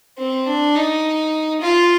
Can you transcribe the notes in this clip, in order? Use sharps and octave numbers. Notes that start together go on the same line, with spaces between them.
C4
D4
D#4
F4